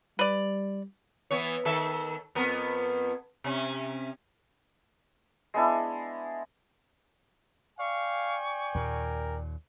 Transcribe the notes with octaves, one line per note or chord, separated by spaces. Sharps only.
G3 B4 D5
E3 B3 C#5
D#3 A4 E5
F2 B3 A#4
C3 C#4
G#3 B3 D4 E4
D5 F5 G5 G#5 C#6
D#2 A#2 A#4